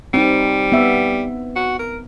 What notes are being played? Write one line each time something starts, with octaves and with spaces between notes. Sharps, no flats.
G3 C4 D#4
B3 E5
F#4
A#4